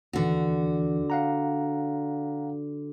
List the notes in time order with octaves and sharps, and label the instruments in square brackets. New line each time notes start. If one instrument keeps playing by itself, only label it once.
[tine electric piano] D#2 E3 [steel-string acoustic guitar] D3 F#4
[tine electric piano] F5 F#5 A#5